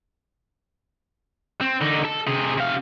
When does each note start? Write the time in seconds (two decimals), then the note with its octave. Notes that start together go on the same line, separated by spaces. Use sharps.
1.61 C4
1.82 D3 D#4
2.05 A4
2.28 C3 G#4
2.58 C3 F5